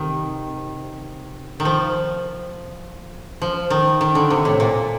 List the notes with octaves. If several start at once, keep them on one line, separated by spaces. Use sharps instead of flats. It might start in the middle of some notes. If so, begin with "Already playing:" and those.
Already playing: C3 D#3
D#3
F3
F3
D#3
D#3
D3
C3
A2
A#2